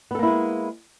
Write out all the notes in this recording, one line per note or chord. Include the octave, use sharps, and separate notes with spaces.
G#3 A#3 B3 E4 A4